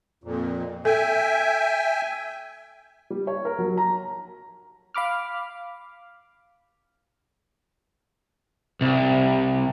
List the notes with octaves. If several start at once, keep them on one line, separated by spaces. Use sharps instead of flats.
F2 A#2
A4 E5 G5 G#5
G3
C#5
A#4
F#3
A#5
F5 B5 D6 F6
C2